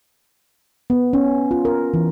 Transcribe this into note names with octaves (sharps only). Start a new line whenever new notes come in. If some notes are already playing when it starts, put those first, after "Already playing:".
B3
C#4
F4
A#4
E3